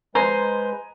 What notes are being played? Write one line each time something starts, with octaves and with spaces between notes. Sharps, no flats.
G#3 B4 C5 D#5 G#5 A#5